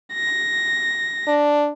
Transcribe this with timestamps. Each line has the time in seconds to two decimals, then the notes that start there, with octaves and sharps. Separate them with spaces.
0.14 A#6
1.28 D4